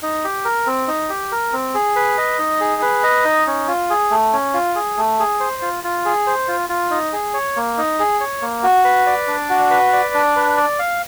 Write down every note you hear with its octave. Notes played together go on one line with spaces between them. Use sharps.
D#4
G4
A#4
C4
D#4
G4
A#4
C4
G#4
B4
D#5
D#4
G#4
B4
D#5
D#4
C#4
F4
G#4
A3
C#4
F4
G#4
A3
G#4
C5
F4
F4
G#4
C5
F4
F4
D#4
G#4
C#5
A#3
D#4
G#4
C#5
A#3
F#4
B4
D5
D4
F#4
B4
D5
D4
B4
D5
F5